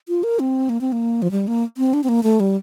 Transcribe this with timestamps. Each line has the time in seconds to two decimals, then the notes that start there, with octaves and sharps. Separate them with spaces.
0.09 F4
0.23 A#4
0.39 C4
0.69 A#3
0.81 C4
0.92 A#3
1.22 F3
1.31 G3
1.47 A#3
1.78 C4
1.94 D4
2.04 C4
2.09 A#3
2.23 A3
2.40 G3